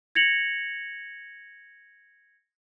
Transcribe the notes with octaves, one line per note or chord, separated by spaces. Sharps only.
G#6 A#6 C#7 F7 F#7